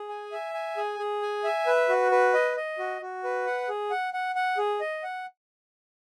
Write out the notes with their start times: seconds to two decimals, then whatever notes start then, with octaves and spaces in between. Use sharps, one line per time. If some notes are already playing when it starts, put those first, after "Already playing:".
Already playing: G#4
0.09 G#5
0.32 E5
0.54 G#5
0.77 G#4
0.99 G#4
1.22 G#5
1.44 E5
1.67 B4
1.89 F#4
2.11 B4
2.34 D#5
2.57 D#5
2.79 F#4
3.01 F#4
3.24 B4
3.46 F#5
3.69 G#4
3.91 F#5
4.13 F#5
4.35 F#5
4.58 G#4
4.81 D#5
5.03 F#5